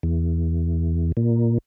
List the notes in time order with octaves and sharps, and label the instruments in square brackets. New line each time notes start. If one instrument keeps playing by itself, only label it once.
[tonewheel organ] E2
A#2